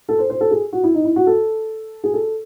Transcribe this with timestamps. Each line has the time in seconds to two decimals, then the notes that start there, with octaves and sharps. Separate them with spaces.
0.09 A4
0.19 C5
0.30 C5
0.41 A4
0.51 G#4
0.73 F#4
0.84 E4
0.95 D#4
1.04 E4
1.16 F#4
1.27 A4
2.04 G#4
2.13 A4